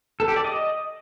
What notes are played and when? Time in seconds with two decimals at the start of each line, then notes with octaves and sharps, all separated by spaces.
0.20 A4
0.28 G4
0.36 D5
0.44 D#5